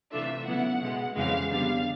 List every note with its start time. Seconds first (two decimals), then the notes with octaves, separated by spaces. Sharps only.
0.12 C3 E3 A3 D4 F4 E5
0.46 C#3 F#3 B3 E4 F#5
0.81 B2 G#3 B3
1.16 F2 C#3 E3 G#3 F5
1.50 D3 G3 B3 F5